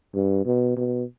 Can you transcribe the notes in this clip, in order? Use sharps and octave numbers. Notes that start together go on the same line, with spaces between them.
G2
B2
B2